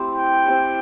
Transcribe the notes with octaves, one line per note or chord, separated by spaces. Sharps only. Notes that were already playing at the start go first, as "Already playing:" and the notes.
Already playing: A3 C4 E4 G4 C5
G5
C4 E4 G4 C5